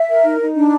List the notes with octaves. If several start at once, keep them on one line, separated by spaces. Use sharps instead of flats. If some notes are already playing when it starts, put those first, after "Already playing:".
Already playing: E5
A#4
D#4
D#4
D4